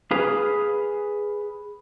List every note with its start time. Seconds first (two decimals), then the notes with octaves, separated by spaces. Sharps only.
0.11 G#4 B4 F5